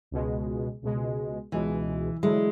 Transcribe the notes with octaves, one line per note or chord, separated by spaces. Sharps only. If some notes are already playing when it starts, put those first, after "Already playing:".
C#2 B2 G#3
C#2 B2 G#3
C#2 B2 E3 G#3
D3 F#3 G#3 A3 E4